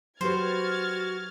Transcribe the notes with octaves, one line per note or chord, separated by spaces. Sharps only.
F#3 F#4 G4 B4 C5 F6 G#6 A6